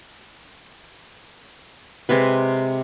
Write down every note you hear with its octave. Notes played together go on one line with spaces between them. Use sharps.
C3 G#3 B4